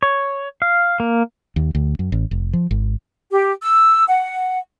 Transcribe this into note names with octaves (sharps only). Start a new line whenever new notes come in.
C#5
F5
A#3
D#2
D2
F#2
A1
F1
F3
G#1
G4
E6
F#5